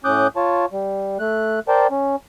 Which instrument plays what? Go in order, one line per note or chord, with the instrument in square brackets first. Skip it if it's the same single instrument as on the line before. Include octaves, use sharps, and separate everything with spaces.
[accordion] A2 C#4 D6 D#6 F#6 G6
F4 C#5 A5
G3
A3 F#6
A#4 C5 D5 G5 A5
C#4